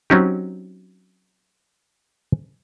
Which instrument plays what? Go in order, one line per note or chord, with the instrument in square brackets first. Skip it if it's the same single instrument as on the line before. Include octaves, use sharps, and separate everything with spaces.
[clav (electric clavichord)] F#3 C4 C#4 D#4 G4